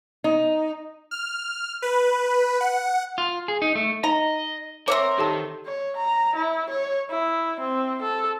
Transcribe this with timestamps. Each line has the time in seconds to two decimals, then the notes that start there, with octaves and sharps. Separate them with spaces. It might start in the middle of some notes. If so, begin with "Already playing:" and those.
0.24 D#4
1.11 F6
1.82 B4
2.61 F#5
3.18 F4
3.48 G#4
3.62 D#4
3.75 A3
4.04 D#4 D#5 A#5
4.88 A#3 C4 A#4 C#5 E5
5.18 D#3 G4 A4 A5
5.66 C#5
5.96 A#5
6.36 E4
6.70 C#5
7.10 E4
7.60 C4
8.02 A4